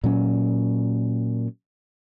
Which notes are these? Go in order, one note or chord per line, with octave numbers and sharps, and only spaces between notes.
A#2 F#3 C#4